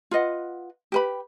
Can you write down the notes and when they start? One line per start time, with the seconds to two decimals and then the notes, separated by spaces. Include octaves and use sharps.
0.11 F4 B4 D#5 F#5
0.92 G4 B4 B5